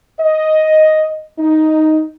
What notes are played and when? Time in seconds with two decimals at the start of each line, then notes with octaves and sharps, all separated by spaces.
0.20 D#5
1.39 D#4